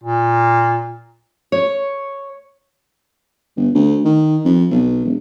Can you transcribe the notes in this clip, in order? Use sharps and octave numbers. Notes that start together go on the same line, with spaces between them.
A#2
C#5
G1
D2
D#3
F2
B1
E1